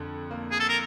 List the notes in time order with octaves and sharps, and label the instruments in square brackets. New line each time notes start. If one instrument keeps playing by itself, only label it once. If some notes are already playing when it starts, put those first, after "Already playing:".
Already playing: [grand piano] F2 D3
A#3
[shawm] G#4
A4
A#4